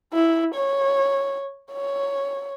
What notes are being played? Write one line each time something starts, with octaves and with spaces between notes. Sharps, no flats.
E4
C#5
C#5